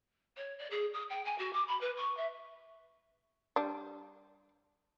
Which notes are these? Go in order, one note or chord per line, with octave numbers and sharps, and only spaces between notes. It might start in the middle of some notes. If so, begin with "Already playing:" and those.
C#5
D5
G#4
D#6
G5
G#5
F#4
D6
B5
B4
C#6
E5
G3 D4